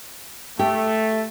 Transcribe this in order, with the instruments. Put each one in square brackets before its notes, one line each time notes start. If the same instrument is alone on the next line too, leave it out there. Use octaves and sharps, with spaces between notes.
[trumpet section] A3 [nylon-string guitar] G4